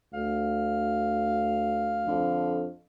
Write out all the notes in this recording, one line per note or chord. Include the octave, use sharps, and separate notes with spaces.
D2 F5
F2 D3